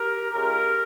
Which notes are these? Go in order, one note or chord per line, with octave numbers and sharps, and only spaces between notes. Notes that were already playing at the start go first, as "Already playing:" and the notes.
Already playing: G4 A#4
C#2 C#3 G#3 G4 A#4